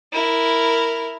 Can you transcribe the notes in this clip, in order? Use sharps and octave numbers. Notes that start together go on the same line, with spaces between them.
E4 A#4